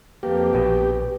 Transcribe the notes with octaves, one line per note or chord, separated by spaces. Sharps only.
F2 A#3 G4 B4
A#1 B2 G5